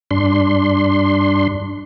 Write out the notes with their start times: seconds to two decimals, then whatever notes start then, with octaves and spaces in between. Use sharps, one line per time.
0.11 G2 D4 C6